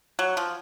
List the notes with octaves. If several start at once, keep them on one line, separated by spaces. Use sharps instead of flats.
F#3
F3